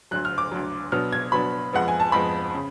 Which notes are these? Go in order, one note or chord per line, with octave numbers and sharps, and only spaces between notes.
D2 D3 F#3 F#6
F6
D6
D2 D3 F#3
B2 F#3 B3 D4 F6
G#6
B2 F#3 B3 D4 B5
F2 F3 G#3 B3 F#5
G#5
A5
F2 F3 G#3 B3 B5
C#3